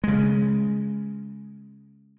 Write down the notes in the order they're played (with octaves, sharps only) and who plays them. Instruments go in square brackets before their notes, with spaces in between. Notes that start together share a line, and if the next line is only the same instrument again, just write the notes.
[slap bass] C#3 G#3